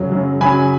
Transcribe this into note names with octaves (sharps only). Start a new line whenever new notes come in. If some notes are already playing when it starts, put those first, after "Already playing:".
Already playing: F#2 C#3 F#3
F#2 C#3 F#3
F#2 C#3 F#3 G#5 B5